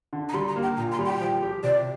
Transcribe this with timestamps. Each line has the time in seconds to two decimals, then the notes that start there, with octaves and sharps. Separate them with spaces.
0.13 D3
0.29 A#5
0.34 G3 C6
0.48 A#5
0.56 A#3
0.63 G5
0.77 A#2 A#5
0.92 C6
0.99 G3
1.06 G5
1.21 F3
1.42 G4
1.63 C3 D5